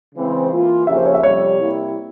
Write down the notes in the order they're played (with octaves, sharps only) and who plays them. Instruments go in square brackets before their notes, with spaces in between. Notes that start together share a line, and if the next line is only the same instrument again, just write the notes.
[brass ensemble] C#3 E3 G#3 C4
E3 A#3 F4
[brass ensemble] C#3 F3 A#3 C#4 G4 [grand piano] E5
[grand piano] C5
C#5
E5
[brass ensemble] F2 C3 G3 [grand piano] C#5
[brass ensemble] C3 G3 A#3 E4